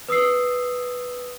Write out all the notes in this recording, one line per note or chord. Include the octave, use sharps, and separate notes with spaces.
B4 D#6 E6 C7